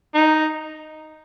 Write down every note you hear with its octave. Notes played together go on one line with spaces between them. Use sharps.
D#4